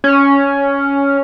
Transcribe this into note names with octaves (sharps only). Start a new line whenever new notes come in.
C#4